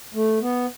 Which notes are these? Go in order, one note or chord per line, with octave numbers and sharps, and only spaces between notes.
A3
B3